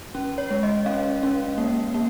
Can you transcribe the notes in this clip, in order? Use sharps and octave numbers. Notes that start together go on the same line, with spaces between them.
C#4
C#5
G#3
D#5
C#4 F5
C#4
A#3
A#3